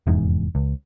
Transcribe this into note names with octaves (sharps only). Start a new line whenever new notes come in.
F1 E2 G#2
C#2